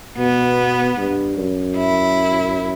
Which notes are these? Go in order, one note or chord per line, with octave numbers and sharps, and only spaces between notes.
B2 B3
G2
F#2
E4